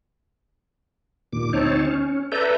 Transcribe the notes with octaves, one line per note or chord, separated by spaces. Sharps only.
D#2 A#2 D6
D2 C4 D#4 C#5 A5
C#4
A4 B4 D5 E5 A#5 G6